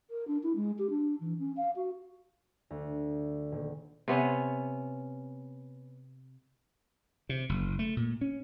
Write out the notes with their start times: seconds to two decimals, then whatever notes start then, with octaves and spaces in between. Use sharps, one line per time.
0.10 A#4
0.27 D4
0.43 E4
0.56 G#3
0.79 G4
0.90 D4
1.21 E3
1.39 C#4
1.57 F5
1.76 F#4
2.70 D2
3.52 D#1
4.08 C3 B3 C#4
7.29 C3
7.49 F#1
7.79 A3
7.97 A#2
8.21 C#4